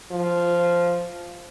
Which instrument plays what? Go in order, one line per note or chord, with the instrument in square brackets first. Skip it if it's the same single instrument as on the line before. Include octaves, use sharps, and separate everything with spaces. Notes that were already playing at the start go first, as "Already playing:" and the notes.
[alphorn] F3